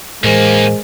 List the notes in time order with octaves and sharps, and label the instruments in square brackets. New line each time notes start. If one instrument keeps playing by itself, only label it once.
[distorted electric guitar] D#2 A#3 [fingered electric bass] A2 E3 [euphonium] G#3 [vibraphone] A#4 C5 G#5